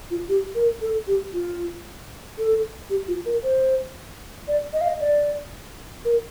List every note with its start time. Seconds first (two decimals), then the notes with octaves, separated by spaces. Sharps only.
0.11 F4
0.29 G4
0.55 A#4
0.81 A4
1.07 G4
1.33 F4
2.38 A4
2.90 G4
3.08 F4
3.26 A#4
3.43 C5
4.48 D5
4.73 D#5
4.81 F5
4.88 D#5
5.00 D5
6.05 A#4